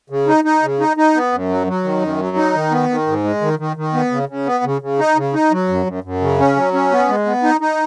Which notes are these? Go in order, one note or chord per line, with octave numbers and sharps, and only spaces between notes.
C#3
D#4
D#4
C#3
D#4
D#4
B3
F#2
F#3
F#3
D#3
F#2
F#3
D#4
D#3
B3
D#3
G#2
G#3
D#3
D#3
D#3
B3
C#3
C#3
B3
C#3
C#3
D#4
C#3
D#4
F#3
F#2
F#2
F#2
C#3
C#4
F#3
C#4
B3
G#3
B3
D#4
D#4